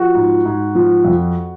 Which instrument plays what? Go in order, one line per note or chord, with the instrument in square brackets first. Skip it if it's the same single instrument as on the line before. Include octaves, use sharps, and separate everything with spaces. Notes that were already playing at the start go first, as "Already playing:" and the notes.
Already playing: [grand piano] F3 F#4
G#2
G#2
F3
F2